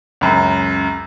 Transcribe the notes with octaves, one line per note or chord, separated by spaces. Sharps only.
C#2 F#2